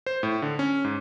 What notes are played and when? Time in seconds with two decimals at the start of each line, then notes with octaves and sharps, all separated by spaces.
0.06 C5
0.23 A2
0.42 D3
0.59 C#4
0.84 G#2